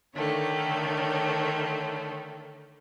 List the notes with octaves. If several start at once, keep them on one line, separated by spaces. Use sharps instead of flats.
D3 D#3 A3 C#5